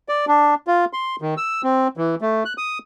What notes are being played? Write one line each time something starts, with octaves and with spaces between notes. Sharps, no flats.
D5
D4
F4
C6
D#3
E6
C4
E3
A3
F#6
D#6